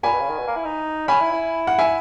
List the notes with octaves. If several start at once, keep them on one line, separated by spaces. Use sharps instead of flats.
A#2 G#5 B5
B2
C#3
D#3
B2
A#3
E4
D#4
C#4 G#5 B5
E4
E4
F#5
E5 G#5